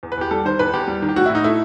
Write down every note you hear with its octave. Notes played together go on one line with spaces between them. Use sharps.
E2
B4
E2 G4
G3 A4
D#3 C5
E2 B4
E2 G4
G3
D#3
G4
A2 F#4
E4
A2
D#4
A3 E4